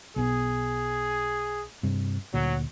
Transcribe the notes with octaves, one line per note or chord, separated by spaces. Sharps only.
B1 B2 G#4
G2 C3
D2 A#2 F#3